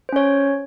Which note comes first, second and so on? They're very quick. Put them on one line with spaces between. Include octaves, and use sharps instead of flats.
C5 C#4 C#5